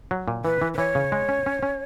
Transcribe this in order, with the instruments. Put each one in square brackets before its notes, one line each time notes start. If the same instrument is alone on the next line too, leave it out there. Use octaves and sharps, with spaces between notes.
[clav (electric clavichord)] F#3
A#2
[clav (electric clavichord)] E3 [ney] B4
[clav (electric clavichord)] E3
[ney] B4
[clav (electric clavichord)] E3 [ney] C#5
[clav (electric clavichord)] C#3
G#3
C#4
C#4
C#4